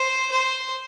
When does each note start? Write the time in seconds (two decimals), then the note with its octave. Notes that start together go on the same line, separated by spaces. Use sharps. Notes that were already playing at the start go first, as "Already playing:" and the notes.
Already playing: C5
0.31 C5